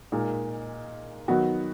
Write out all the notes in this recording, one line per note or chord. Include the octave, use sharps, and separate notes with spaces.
A#2 G#3 D#4 A#4
D#3 F#3 B3 F#4